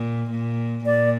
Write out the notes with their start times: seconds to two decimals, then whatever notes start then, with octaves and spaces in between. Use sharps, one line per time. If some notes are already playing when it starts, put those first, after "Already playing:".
Already playing: A#2
0.31 A#2
0.85 A#2 D5